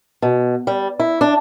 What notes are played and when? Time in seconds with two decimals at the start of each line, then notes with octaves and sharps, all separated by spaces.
0.22 B2
0.67 G3
1.00 E4
1.21 D4